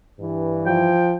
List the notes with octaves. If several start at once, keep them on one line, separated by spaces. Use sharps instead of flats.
G2 E3
F3 G5